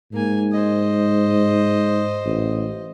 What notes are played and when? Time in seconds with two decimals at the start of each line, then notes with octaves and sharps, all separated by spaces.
0.13 G#2 A#3 G#5
0.52 C5 D#5
2.26 A1